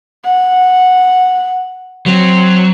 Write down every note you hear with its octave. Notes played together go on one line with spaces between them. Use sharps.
F#5
F#3 C4